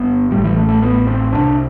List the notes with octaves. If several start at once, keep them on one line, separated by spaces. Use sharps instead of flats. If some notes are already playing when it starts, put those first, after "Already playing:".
Already playing: G1 G2 B3
A1 A2 G3
E3
A3
A3
B3
C4
C2 C3 D4